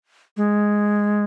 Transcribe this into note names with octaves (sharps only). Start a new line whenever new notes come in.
G#3